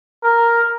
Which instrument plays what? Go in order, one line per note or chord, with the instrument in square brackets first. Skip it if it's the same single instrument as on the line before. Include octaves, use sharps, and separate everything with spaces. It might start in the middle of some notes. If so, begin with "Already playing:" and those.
[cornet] A#4